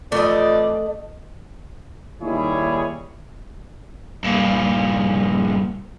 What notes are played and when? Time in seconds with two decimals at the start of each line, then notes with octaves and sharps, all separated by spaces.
0.12 F2 E3 A3 D5 D#5
2.21 D#2 G3 D#4 E4 G#4 C#5
4.24 G2 A#2